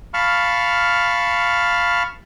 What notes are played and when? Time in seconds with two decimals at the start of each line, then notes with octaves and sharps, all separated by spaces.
0.14 F5 A5 B5 C#6 F6